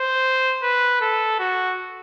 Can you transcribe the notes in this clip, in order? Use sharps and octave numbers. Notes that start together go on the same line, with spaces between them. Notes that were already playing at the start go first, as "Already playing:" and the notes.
Already playing: C5
B4
A4
F#4